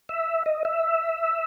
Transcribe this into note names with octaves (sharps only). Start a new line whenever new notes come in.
E5
D#5
E5